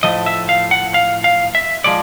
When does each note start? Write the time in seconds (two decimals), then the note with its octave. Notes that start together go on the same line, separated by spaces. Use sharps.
0.03 A2 F3 A3 D#5
0.26 E5
0.49 F5
0.71 F#5
0.94 F5
1.24 F5
1.55 E5
1.84 F3 G#3 D5